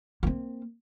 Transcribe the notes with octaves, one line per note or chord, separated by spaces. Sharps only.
A#3 C4